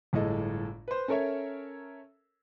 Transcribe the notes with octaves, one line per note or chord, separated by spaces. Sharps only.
G1 A2 G#3 A4 D#5
B4 C5
C#4 A4 A#4 C#5 E5